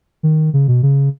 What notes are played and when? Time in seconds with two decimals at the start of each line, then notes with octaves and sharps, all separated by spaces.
0.23 D#3
0.53 C#3
0.68 B2
0.83 C#3